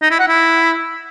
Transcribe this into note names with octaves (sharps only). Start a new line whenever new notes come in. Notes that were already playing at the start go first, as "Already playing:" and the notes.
D#4
E4
F#5
E4